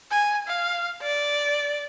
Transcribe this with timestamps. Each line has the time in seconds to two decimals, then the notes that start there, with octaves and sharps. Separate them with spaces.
0.11 G#5
0.48 F5
1.02 D5